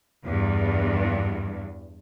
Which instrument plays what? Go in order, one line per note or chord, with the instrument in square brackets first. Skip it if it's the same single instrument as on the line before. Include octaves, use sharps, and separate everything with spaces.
[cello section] E2 G2